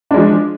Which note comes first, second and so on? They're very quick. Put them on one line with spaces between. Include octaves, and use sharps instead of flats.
D4 G#3 F3